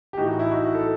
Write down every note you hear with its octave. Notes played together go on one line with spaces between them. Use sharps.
G4
A2 E3 D#4 F#4
E4
D#4 F#4
A4